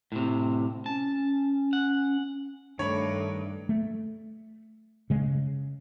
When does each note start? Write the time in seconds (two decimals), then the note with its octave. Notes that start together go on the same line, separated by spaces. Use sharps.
0.12 A2 C3
0.86 C#4 A5
1.73 F#5
2.79 G2 D#3 A3 D4 C#5 B5
3.69 A3
5.10 C#3 G#3